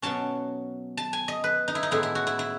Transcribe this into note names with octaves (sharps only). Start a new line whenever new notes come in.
B2 F#3 C#4 A5
A5
G#5
D#5
B4
D#4
E4
D#4
A2 G#3 B3 E4
E4
F#4
E4
E4